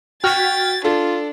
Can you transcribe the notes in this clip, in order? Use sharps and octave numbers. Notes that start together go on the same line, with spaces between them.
F#4 G5 F6 G#6 A6 B6
D4 F4 A4